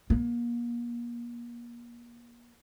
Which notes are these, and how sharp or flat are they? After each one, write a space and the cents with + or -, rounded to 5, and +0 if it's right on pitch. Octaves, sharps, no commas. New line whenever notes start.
A#3 +35